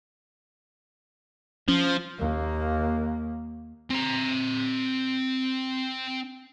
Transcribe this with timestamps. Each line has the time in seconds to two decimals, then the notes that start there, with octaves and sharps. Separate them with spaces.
1.68 F3 C#4
2.19 D#2 A#3
3.90 C4 A#5